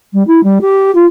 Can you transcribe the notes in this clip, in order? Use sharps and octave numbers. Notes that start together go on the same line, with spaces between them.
G3
E4
G3
G4
F4